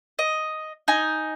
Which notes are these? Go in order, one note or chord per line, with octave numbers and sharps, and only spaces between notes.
D#5
D#4 G#5